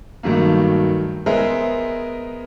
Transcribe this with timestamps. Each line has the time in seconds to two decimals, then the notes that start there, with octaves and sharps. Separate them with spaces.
0.23 G2 D#3 F#3 A3 A#3
1.26 G#3 B3 G#4 A#4 C5 E5